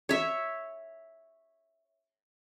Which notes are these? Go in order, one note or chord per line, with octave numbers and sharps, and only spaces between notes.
C#5 E5